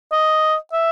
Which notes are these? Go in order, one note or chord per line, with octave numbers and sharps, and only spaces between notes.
D#5
E5